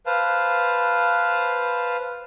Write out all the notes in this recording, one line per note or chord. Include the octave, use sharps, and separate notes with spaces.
B4 C5 F5 A5